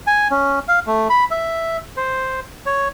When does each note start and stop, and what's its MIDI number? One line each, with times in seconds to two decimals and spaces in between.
0.07 0.28 80
0.31 0.59 61
0.68 0.79 77
0.87 1.08 57
1.10 1.24 83
1.31 1.77 76
1.97 2.40 72
2.66 2.88 73